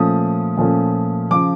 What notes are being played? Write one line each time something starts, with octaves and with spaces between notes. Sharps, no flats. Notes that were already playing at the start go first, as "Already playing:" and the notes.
Already playing: A#2 F3 A3 C#4 D#6
A#2 F3 A3 C#4
C#3 F3 D6